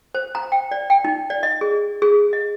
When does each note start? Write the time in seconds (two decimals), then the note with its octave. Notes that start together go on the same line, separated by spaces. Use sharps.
0.15 C5
0.35 A#5
0.52 G5
0.71 D5
0.90 G5
1.05 D#4
1.30 D5
1.43 D#5
1.61 G#4
2.02 G#4
2.33 D#5